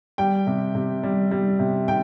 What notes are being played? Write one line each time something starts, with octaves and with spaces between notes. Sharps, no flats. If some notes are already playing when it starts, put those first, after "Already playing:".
G3 G5
C3
C3
G3
G3
C3
C3 G5